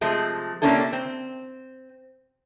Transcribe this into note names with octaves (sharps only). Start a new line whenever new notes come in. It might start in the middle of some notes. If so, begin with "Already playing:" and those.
C3 F3 G#3 A3
C3 A#3 C#4 D4 E4 A4
C4